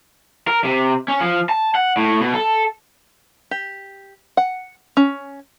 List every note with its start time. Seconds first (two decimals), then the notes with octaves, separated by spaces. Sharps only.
0.47 A#4
0.64 C3
1.08 C#4
1.21 F3
1.49 A5
1.75 F#5
1.97 A2
2.20 B2
2.34 A4
3.51 G4
4.37 F#5
4.97 C#4